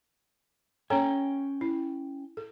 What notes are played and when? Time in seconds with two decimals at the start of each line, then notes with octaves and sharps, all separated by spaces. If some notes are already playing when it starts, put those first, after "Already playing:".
0.90 C#4 A4 C#5 G5 G#5 A#5
1.61 E4
2.37 A4